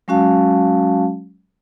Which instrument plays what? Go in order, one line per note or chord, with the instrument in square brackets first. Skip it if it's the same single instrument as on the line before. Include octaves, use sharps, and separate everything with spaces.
[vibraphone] F#3 G#3 C#4 F#4 F5 A5